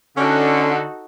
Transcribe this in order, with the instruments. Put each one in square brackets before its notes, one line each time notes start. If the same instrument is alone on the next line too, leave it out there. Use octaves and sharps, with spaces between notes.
[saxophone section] D3 [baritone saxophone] C#4 [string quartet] D#4 F#4 A4